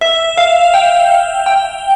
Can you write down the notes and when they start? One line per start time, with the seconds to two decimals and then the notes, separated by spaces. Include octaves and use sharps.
0.01 E5
0.37 F5
0.74 G5
1.46 G5